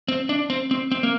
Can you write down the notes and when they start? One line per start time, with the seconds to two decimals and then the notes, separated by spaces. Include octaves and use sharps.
0.08 C4
0.29 D4
0.50 C4
0.71 C4
0.92 C4
1.03 A#3